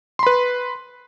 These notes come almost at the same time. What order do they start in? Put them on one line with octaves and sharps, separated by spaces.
C6 B5 B4